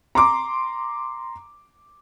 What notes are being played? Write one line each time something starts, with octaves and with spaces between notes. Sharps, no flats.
A#5 C6 D6